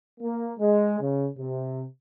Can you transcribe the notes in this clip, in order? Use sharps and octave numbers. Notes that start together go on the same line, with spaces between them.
A#3
G#3
C#3
C3